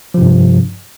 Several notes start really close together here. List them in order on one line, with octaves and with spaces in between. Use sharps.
F3 C3 G2